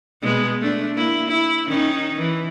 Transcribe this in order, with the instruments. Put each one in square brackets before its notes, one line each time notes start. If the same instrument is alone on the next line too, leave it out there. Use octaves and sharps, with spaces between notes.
[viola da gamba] B2 G#3 B3
A3 D4
A#3 E4
E4
D#3 C#4 D#4
E3